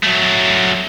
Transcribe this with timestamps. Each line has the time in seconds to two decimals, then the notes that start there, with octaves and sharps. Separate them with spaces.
0.03 F#3 A3